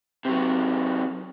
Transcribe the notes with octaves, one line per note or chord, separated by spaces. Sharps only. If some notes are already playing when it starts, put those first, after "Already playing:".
C3 F#3